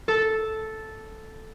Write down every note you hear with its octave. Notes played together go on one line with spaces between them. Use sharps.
A4